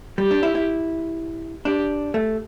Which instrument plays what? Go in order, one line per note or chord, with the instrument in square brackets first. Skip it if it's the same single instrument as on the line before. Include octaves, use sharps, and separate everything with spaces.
[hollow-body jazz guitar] G3 [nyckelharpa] G4
[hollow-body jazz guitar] D4
E4
E4
[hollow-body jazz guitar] D4 [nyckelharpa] G4
[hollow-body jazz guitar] A3